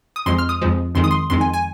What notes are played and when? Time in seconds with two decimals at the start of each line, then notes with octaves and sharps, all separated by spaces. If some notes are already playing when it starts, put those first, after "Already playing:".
0.16 D#6
0.26 F2 F3 G#3 C6
0.39 F6
0.49 D#6
0.62 F2 F3 G#3
0.95 F2 D#3 G#3 C6
1.04 D#6
1.11 C6
1.30 F2 D#3 G#3 C6
1.41 G#5
1.53 G#5